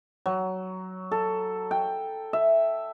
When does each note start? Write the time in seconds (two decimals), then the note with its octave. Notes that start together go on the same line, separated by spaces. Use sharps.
0.26 F#3
1.12 A4
1.71 G5
2.33 E5